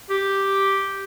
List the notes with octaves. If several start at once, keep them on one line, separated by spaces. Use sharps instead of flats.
G4